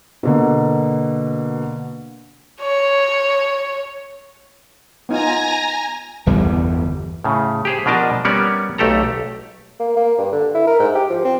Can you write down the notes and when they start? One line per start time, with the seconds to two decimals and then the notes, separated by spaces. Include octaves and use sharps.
0.23 B2 D3 A#3
2.61 C#5
5.09 B3 D#4 F4 G#5 A#5 A#6
6.26 G1 E2 E3 G3
7.24 A2 C#3
7.65 G4 G#4 C5
7.86 B2 F3 D4 A#4 D#5 A5
8.25 G3 A#3 B3 C#4 C#5 D5
8.78 B1 A3 G4 A4 A#5
9.80 A#3
9.96 A#3
10.18 G2
10.32 D3
10.54 E4
10.67 A#4
10.80 G#2
10.95 G4
11.10 F3
11.25 C4